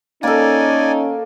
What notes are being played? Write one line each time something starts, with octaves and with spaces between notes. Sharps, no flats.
A#3 C#4 D#4 A4 D5 G#5